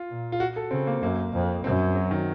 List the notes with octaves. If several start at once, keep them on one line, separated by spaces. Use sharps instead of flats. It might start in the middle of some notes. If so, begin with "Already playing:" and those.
Already playing: F4
A#2
F4
F#4
A4
C#3 C4
A#3
F#2 A#3
F2
F#2 C4
F#3
D#3